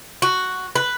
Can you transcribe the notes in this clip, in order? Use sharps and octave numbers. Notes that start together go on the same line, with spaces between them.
F#4
B4